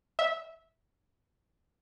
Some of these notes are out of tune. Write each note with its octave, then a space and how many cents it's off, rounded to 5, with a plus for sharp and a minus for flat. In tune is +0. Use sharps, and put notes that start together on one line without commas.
E5 -15